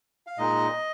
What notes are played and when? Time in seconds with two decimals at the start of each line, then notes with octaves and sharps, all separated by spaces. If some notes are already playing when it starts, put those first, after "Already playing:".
0.27 F5
0.38 A#2 G#3 D#4 D#5